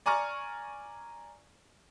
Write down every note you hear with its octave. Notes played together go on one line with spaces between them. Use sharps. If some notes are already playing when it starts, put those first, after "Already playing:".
D5 G#5 A#5 C#6 F6 A6